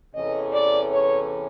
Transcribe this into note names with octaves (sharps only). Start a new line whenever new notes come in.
E2 C3 E3 A3 C#4 D#5
D5
C#5